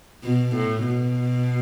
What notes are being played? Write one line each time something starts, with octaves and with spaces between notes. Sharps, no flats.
B2
A2
B2